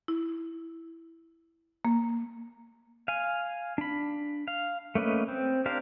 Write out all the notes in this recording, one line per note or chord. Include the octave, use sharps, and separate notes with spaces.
E4
A#3
F5 G#5
D4 B5
F5
A3 A#3 C#4 B4 D#5
C4
D4 G4 A#4 C5 F5